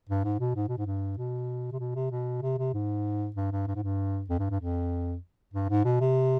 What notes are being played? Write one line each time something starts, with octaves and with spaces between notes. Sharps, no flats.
G2
G#2
B2
G#2
B2
G#2
G2
B2
C3
B2
C3
B2
C3
C3
G#2
G2
G2
G2
G#2
G2
F2
G2
G2
F2
G2
G#2
B2
C3